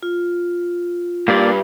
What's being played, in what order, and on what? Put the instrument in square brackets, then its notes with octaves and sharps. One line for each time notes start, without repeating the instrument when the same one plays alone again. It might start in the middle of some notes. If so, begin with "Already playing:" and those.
[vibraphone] F4
[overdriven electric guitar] G2 [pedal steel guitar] A#3 G4 D5